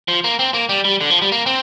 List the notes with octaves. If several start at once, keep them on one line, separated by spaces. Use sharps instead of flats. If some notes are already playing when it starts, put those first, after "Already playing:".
F3
A#3
C4
A#3
G3
G3
D3
F3
G3
A#3
C4